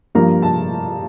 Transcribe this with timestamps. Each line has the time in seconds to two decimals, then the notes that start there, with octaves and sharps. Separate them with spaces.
0.15 G2 F3 A#3 A#5
0.42 A5